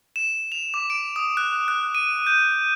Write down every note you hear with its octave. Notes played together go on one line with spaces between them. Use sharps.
E7
F7
D6
D7
D#6
F#6
F#6
D#7
G6